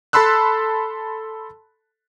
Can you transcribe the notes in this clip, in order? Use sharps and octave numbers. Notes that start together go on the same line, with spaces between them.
A4 A5 B5 C6 E6 F#6